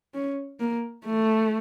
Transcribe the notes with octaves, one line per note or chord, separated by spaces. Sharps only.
C#4
A#3
A3